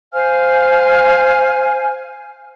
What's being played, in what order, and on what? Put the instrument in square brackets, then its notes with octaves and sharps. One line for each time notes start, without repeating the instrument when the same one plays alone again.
[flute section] C5 F5 G#5 F6